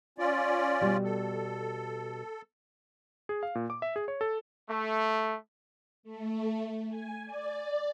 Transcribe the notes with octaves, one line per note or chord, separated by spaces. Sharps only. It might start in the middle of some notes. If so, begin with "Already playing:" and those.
C#4 F4 D5
B2 G3
A4
G#4
F5
A#2
D6
E5
G#4
C#5
A4
A3
A3
G#5
D5